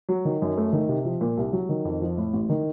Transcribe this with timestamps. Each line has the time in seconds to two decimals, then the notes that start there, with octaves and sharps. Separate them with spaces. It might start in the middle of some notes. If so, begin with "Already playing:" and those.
0.09 F#3
0.25 D#3
0.42 F#2
0.57 A3
0.73 D#3
0.89 C3
1.05 F3
1.21 A#2
1.37 C2
1.53 F#3
1.69 D#3
1.85 F2
2.01 F3
2.17 A2
2.33 A1
2.50 D#3